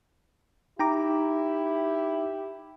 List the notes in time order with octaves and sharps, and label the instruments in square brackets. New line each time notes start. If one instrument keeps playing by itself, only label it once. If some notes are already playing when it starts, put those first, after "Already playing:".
[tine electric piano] D#4 [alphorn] E4 [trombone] G4 [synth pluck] G5 A#5 D6